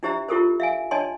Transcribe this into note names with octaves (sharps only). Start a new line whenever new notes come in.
D4 E4 G4 C5 E5 A#5
E4 F4 G4 A4 A#4 C5
E5 F5 G#5
D4 C#5 D#5 G#5 A5 C6